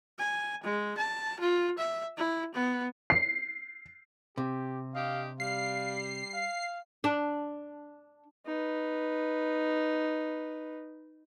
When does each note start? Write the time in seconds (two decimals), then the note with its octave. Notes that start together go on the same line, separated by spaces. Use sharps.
0.19 G#5
0.63 G#3
0.97 A5
1.40 F4
1.78 E5
2.17 E4
2.54 B3
3.10 C7
4.38 C3 G4
4.94 D4 G4 D#5 F5
5.40 G3 F5 C7
6.34 F5
7.04 D4
8.46 D#4 B4